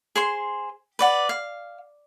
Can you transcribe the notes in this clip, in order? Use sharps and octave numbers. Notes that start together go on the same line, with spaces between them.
G#4 C5 C6
B4 D5 F#5
F5